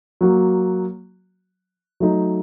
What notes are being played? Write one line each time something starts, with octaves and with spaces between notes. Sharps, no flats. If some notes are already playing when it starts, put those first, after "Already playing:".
F#3 A#3 F#4
F#3 A3 D#4